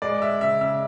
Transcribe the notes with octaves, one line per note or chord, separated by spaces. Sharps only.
G#3 D5
G#3 E5
C#3 E5
C#3 E5